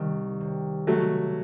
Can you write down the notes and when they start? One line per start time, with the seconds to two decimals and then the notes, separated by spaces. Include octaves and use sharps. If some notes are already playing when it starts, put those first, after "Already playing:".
Already playing: C2 D#3
0.41 C3
0.87 C#2 F#3 A3